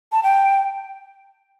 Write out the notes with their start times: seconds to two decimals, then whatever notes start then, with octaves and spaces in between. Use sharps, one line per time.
0.12 A5
0.23 G5